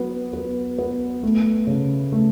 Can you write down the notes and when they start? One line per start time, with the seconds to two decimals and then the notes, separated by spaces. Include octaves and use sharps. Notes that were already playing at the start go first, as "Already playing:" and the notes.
Already playing: F#3 B3
0.33 B3
0.79 B3
1.23 A3
1.67 C#3
2.12 A3